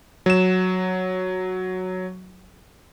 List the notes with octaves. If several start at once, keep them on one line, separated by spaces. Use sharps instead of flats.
F#3 E7